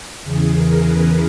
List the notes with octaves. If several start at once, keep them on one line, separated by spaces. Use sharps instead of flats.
E2 C#3 E3 G#4
A#4
B4